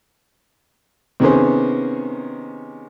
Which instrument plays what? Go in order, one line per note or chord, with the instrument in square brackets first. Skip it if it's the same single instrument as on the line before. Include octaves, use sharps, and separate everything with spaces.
[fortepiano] C3 D#3 B3 C#4 G#4 C5